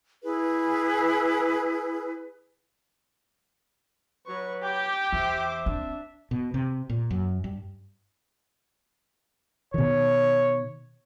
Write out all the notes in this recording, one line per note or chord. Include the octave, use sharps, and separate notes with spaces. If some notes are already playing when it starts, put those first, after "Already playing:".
E4 G#4 B4
F#3 B4 C#6
G4 D6 G6
E2 C5 E5 D6
C4 D4
B2
C3
A#2
F#2
G2
B2 D#3 C#5